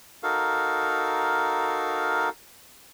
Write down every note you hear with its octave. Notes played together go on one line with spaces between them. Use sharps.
D#4 F#4 A4 A#4 F5